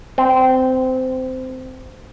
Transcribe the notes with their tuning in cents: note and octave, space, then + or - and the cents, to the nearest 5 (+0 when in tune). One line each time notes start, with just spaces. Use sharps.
C4 -20